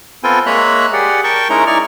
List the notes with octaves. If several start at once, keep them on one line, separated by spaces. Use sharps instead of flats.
B3 C4 F4 A4 G5 G#5
G#3 A#3 C#5 E5 A#5 F#6
G4 G#4 D5 F#5
A#4 G5 A5 C#6
G#3 C#4 D#4 E4 A#4 A#5
D#4 E4 D5 C#6 F6